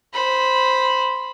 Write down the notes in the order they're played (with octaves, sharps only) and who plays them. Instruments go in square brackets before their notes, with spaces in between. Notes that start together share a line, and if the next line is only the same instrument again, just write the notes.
[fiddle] C5 B5